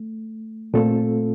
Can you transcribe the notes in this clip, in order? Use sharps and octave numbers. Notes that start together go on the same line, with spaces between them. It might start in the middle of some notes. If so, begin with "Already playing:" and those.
Already playing: A3
A#2 A3 C4 F4 A4